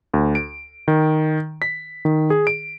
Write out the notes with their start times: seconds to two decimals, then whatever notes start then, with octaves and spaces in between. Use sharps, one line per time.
0.14 D2
0.35 D7
0.88 D#3
1.62 B6
2.05 D#3
2.30 G#4
2.47 D7